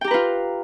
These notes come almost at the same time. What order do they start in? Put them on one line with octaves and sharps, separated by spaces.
G5 G4 A#5 B4 F4